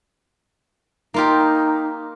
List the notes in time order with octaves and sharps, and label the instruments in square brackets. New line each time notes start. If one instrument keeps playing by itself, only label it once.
[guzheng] A#3 F4 G4 [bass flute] D#4